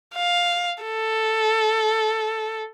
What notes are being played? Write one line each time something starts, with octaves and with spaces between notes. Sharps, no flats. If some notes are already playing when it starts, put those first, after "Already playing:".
F5
A4